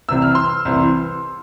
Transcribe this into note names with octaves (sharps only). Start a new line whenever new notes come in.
C2 C3 E3 E6
F6
C6 E6
C2 C3 E3